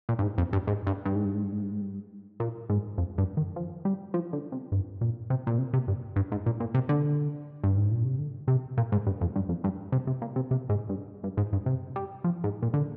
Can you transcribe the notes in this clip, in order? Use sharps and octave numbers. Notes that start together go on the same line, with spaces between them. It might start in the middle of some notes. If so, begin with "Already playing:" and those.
A#2
G2
G#2
F2
G2
G#2
G2
G2
G#2
G2
G#2
G2
G#2
G2
G#2
G2
A#2
G#2
F2
G2
D#3
F3
G3
F3
D3
C3
G2
A#2
C3
A#2
C3
C3
G2
G2
G#2
A#2
A#2
C3
D3
G2
G#2
A#2
C3
D3
C3
A#2
G#2
G2
F2
G2
F2
G2
C3
C3
A#2
C3
C3
G#2
G2
G2
G#2
G2
C3
G3
F3
G#2
A#2
D3